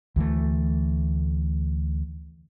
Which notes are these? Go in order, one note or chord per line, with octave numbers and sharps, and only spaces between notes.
D2 E3 A3